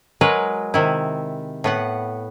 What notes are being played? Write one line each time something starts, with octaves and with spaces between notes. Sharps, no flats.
F#3 G#3 A#4 B4
C3 D#3 E4
A2 B3 F#5